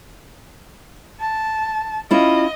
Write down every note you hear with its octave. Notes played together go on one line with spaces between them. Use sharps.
A5
C#4 E4 F4 D#5